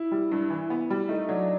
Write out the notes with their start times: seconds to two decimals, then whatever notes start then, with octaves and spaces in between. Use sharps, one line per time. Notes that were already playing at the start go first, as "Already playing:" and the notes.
Already playing: E4
0.12 G3
0.32 G2
0.50 E3
0.70 B3
0.90 G3
1.09 A3 D#4
1.29 F#3 D4